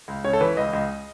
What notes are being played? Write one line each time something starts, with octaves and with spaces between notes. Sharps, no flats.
C#2
C#3 C#5
A4
E3 B4
C#2 D#5
C#2